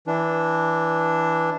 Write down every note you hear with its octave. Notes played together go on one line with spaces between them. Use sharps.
E3 D4